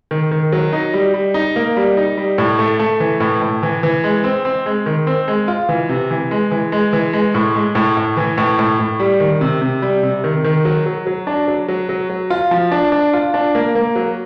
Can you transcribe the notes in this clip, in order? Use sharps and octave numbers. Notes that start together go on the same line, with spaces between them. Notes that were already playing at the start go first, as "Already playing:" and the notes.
D#3
D#3
F#3
D#4
G3
G3
D#4
A#3
G3
D#4
G3
A2
A3
A3
E3
A2
A2
E3
E3
G#3
C4
C4
G#3
D#3
C4
G#3
F4
E3
C3
E3
G#3
E3
G#3
E3
G#3
A2
G#3
A2
A2
E3
A2
A2
A2
G3
D#3
C3
C3
G3
C3
D#3
D#3
F#3
F#3
F#3
D4
F#3
F#3
F#3
F#3
F4
F3
D4
D4
F4
D4
A#3
A#3
F#3